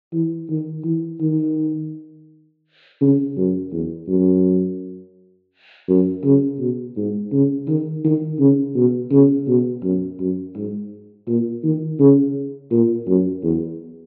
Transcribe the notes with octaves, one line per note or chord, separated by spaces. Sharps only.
E3
D#3
E3
D#3
C#3
F#2
E2
F#2
F#2
C#3
B2
G#2
C#3
D#3
D#3
C#3
B2
C#3
B2
F#2
F#2
G#2
A#2
D#3
C#3
A#2
F#2
E2